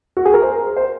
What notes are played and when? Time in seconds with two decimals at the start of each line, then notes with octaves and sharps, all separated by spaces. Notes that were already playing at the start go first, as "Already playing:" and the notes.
0.17 F#4
0.25 G#4
0.34 A#4
0.42 C5
0.76 C5